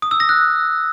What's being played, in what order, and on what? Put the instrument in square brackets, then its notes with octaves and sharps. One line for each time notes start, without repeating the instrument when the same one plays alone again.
[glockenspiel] D#6
E6
A#6
F#6